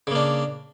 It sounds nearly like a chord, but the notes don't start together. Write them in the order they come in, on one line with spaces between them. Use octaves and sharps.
C#3 A#3 D4